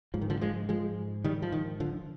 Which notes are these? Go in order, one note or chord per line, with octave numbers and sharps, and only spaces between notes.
G#2 F3
D#3
D3 F3
F3 G#3
F3 G#3
D#3 G3
F3
D#3
D3 F3